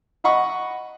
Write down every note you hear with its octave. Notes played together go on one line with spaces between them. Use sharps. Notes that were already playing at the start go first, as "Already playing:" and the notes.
D#5 F#5 B5 C#6